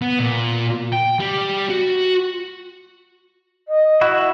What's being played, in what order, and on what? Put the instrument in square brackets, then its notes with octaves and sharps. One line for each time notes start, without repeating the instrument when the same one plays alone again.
[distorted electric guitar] B3
A#2
G5
G3
F#4
[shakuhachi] D#5
[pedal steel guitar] E4 F#4